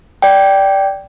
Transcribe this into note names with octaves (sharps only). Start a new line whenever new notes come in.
D5 G5